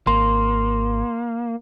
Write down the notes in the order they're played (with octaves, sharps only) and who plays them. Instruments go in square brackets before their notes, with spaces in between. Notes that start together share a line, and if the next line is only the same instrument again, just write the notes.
[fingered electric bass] G#1 [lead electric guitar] A#3 [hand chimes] C6